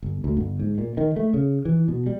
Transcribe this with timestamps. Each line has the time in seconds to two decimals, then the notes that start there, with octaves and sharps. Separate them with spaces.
0.03 G1
0.24 D2
0.37 G1
0.60 G#2
0.78 A#2
0.97 D#3
1.16 A3
1.34 C#3
1.65 E3
1.88 B2
2.06 G3